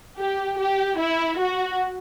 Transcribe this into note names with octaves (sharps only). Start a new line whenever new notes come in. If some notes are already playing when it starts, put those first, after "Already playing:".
G4
G4
E4
F#4